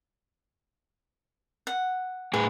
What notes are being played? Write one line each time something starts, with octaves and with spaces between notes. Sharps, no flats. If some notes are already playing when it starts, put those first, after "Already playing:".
F#5
A2 G#4 B4